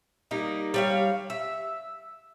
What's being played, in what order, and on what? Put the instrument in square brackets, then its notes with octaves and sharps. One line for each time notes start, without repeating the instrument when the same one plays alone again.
[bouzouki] G3 A#3 D#4
G3 C#5 F5
E5